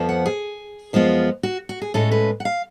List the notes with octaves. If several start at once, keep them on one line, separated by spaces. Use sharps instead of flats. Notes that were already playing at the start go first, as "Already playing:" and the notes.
Already playing: F2 F3 B3
F#5
G#4
F#2 F3 G#3 B3 F4
F#4
F#4
G#4
A2 G#3 C#4 A4
B4
F#5
F5